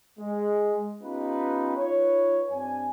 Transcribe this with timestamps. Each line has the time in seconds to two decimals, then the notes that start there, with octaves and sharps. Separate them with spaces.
0.19 G#3
1.03 B3 C#4 D#4 F4 G4 B4
1.77 D#4 F4 B4 C#5
2.51 G2 C4 D4 G#5